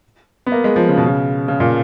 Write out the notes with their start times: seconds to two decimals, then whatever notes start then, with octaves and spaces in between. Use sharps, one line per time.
0.46 B3
0.52 A#3
0.64 G#3
0.76 F3
0.88 C#3
0.97 B2
1.06 C#3
1.48 C#3
1.60 A#2